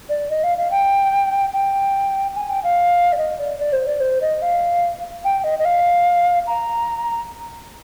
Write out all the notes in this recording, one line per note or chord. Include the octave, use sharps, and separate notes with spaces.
D5
D#5
F5
F5
G5
G5
G#5
G5
F5
D5
D#5
D5
D5
C5
D5
C5
D#5
F5
G5
D#5
D#5
F5
A#5